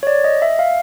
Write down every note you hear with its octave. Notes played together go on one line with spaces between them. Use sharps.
C#5
D5
D#5
E5
F5